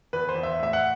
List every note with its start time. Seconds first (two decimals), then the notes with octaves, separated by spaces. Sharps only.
0.13 E2 B4
0.29 C5
0.35 E2
0.43 E5
0.59 A2 E5
0.73 F#5